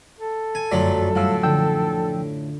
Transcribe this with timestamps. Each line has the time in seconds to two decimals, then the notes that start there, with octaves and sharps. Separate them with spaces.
0.19 A4
0.55 G#5
0.72 G1 F#2 F3 F#3 A3 D5
1.15 A2 G3 F4 F5 F#5 E6
1.43 D3 F3 D4 G5 E6